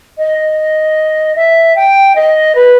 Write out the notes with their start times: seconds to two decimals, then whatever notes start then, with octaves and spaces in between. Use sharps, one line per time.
0.18 D#5
1.36 E5
1.76 G5
2.15 D#5
2.55 B4